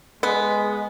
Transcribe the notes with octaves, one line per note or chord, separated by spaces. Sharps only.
G#3 B3